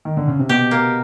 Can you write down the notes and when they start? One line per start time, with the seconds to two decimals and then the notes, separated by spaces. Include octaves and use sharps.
0.05 D#3
0.17 D3
0.28 C#3
0.39 C3
0.49 B2 G4
0.71 A#3